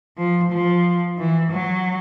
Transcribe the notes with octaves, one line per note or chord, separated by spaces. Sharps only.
F3
F3
E3
F#3